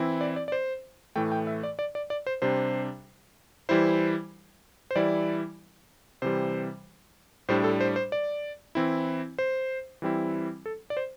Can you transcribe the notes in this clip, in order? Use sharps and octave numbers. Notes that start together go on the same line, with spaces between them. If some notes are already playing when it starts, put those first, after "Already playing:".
Already playing: E3 C4 E4
D5
D5
D5
C5
A2 E3 A3 G5
G5
E5
D5
D5
D5
D5
C5
C3 G3 D4 C5
E3 G3 E4 C5
C5
E3 G3 E4 D5
C3 E3 G3 C5
A2 G3 D4 C5
A4
C5
C5
D5
E3 C4 E4
C5
E3 G3 C4 E4
A4
D5
C5